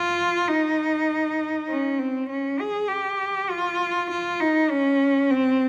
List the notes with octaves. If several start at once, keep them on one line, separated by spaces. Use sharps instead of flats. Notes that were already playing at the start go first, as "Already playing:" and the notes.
Already playing: F4
D#4
C#4
C4
C#4
G#4
G4
F4
F4
D#4
C#4
C4